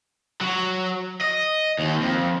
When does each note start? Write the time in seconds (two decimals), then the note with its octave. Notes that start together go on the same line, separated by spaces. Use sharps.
0.41 F#3
1.21 D#5
1.79 D#2
2.01 F2